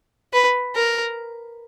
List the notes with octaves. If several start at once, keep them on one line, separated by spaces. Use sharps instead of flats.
B4
A#4